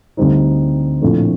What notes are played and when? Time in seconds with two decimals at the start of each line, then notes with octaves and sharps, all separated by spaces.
0.17 D2 D3 G3 C4 D#4
1.02 A#1 A2 F3 A3 C4